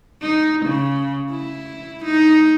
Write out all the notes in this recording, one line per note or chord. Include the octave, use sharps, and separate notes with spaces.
D#4
C#3
E4
D#4